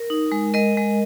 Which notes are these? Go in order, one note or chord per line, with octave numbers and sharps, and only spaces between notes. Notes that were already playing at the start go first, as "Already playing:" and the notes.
Already playing: A#4
D#4
G#3
G#3 A#4 D#5
G#3